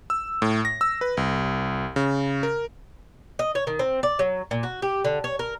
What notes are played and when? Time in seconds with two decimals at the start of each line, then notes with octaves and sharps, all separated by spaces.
0.10 E6
0.42 A2
0.65 A#6
0.81 E6
1.01 B4
1.17 C2
1.96 C#3
2.43 A#4
3.39 D#5
3.55 C#5
3.67 D#3
3.79 C4
4.03 D5
4.19 F#3
4.51 A#2
4.63 F#4
4.82 G4
5.05 D3
5.24 C#5
5.39 A#4